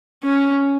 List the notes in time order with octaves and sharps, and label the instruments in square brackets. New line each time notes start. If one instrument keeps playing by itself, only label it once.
[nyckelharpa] C#4